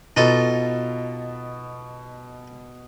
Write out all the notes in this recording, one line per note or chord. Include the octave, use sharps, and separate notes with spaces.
B2 D#4 F4 A4